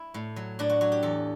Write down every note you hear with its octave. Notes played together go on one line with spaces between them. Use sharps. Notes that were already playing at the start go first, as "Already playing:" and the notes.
Already playing: E4
A2
F#3
A2 D4
F#4
F#3 F#4
G4
E2 A4